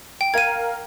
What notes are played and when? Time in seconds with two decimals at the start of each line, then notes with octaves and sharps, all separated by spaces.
0.21 G5
0.34 A#4 F5 G#6 D#7